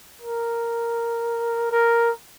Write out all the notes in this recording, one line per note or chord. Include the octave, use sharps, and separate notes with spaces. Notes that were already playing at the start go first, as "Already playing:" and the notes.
A#4
A#4